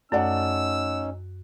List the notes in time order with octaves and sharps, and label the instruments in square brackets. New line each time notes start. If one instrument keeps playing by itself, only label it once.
[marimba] F#2 A5 [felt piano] A3 D5 F#5 [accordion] C#4 D#4 [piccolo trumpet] E6